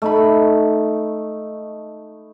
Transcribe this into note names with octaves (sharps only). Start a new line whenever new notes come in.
A3 D#4 B5